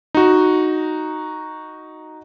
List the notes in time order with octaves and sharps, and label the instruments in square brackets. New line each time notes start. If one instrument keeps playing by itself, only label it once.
[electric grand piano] D#4 F#4